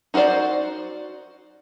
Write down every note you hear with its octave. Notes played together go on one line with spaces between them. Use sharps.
D#4 F#4 B4 C5 D5